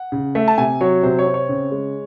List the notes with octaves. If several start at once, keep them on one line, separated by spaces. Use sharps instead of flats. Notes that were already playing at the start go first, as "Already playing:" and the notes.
Already playing: F#5
C#3
A3
A5
C3 G#5
F#3 C#5
C3 C5
C#5
C4
C#5
C#3
G#3